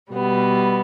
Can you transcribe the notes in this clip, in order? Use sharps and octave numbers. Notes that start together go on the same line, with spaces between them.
B2 G3 B3